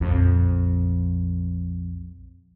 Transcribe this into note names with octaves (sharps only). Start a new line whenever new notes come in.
A#1 F2